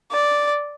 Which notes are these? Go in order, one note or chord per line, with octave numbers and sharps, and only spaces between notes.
D5